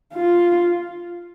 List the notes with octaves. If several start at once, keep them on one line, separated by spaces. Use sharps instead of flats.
F4